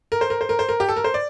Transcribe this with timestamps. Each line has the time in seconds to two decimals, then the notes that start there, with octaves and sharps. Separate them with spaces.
0.12 A#4
0.21 C5
0.30 A#4
0.41 C5
0.49 A#4
0.59 C5
0.69 A#4
0.80 G4
0.89 A4
0.96 A#4
1.04 C5
1.14 D5